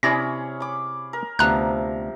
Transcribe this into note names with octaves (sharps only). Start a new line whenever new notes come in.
C3 C#4 E4 G#4 D5 B5 A#6
B5 D6
A#4
D2 C3 F3 B3 A#5 F#6